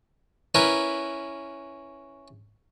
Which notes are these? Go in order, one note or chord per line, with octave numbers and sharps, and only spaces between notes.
C#4 E4 A#4 B4